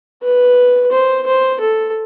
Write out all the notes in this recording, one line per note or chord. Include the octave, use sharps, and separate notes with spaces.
B4
C5
C5
A4